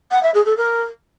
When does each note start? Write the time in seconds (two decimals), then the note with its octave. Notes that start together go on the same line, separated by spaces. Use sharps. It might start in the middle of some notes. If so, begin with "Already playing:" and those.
0.11 F#5
0.23 E5
0.34 G#4
0.46 A4
0.57 A#4